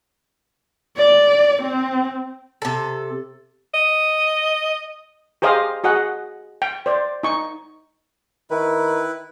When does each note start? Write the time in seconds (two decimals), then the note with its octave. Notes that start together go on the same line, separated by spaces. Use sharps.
0.97 D5
1.63 C4
2.62 C3 A4
3.74 D#5
5.42 G4 G#4 C5 D#5 F5 D#6
5.84 F#4 G#4 D#5 F#5
6.62 G5
6.86 C5 D5
7.23 D#4 C#6
8.51 D#3 E4 B4